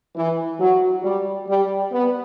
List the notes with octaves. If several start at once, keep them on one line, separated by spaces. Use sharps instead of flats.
E3
F#3
G3
G3
B3